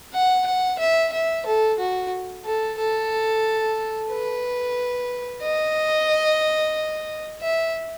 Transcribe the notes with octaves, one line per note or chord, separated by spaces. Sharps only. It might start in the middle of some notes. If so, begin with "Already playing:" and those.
F#5
F#5
E5
E5
A4
F#4
A4
A4
B4
D#5
E5